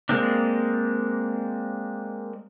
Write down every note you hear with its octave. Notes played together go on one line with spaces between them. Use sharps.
G#3 A#3 C4 D4